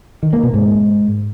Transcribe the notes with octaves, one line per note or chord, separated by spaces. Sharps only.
D#3
A#3
B2
G#2